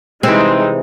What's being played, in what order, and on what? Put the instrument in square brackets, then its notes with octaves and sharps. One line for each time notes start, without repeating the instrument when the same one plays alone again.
[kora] C3 E3 [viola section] G#3 D#4 [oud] C4